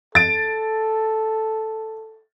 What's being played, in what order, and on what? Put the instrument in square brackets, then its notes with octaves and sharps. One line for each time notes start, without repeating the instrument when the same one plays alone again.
[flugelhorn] A4 [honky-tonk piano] A6 D7